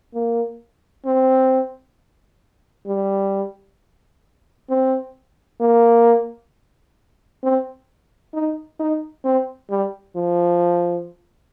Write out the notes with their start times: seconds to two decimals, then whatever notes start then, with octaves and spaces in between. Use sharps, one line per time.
0.14 A#3
1.05 C4
2.87 G3
4.70 C4
5.60 A#3
7.43 C4
8.33 D#4
8.79 D#4
9.24 C4
9.70 G3
10.16 F3